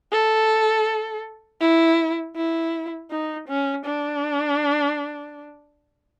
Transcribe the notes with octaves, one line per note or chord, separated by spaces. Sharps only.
A4
E4
E4
D#4
C#4
D4